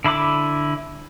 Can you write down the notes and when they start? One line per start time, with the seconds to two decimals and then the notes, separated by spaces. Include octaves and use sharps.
0.04 D3 E4 B5 D6